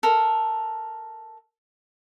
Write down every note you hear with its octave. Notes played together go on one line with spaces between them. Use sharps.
A4 A#4